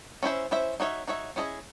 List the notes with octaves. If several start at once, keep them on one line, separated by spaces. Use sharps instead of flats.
C#4 E4 C5 E5
C#4 E4 C5 E5
D#4 F#4 C#5 E5
D#4 F#4 C#5 E5
C#4 E4 G#4 C5 D#5